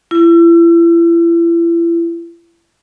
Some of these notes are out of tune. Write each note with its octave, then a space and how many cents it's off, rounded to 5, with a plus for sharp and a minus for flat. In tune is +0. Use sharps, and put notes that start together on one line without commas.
E4 +35